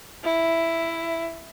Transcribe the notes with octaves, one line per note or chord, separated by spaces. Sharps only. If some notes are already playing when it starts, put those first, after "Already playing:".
E4